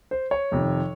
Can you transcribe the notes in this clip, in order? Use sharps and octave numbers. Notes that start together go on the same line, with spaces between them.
C5
C#5
F2 C3 D#3